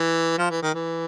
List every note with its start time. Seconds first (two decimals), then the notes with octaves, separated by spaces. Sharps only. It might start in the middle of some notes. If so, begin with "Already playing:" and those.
Already playing: E3
0.38 F3
0.50 E3
0.63 D#3
0.75 E3